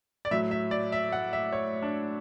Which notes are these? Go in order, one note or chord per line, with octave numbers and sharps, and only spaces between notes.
D5
A2 F#3 E5
E5
D5
E5
F#5
E5
C#5
D4